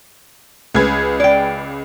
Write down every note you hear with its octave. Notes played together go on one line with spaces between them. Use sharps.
C#2 B4 G#6
D5 G5